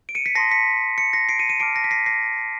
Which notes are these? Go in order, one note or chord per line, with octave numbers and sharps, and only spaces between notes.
D7
C#7 D#7
B6 C#7
A5 C6 D#6 A#6 C7
B6 C#7
B6 C#7
A#6 C7
C7 D7
C#7 D#7
C#7 D#7
A5 D6 F6 C7 D7
A#6 C7
B6
A#6 C7
A#6 C7